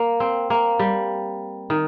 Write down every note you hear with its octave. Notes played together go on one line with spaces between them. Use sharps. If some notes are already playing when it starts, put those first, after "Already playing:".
Already playing: A#3
C4
A#3
G3
D#3